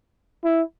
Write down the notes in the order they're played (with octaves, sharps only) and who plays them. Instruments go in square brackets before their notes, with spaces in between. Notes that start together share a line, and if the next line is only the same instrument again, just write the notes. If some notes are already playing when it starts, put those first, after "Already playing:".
[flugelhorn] E4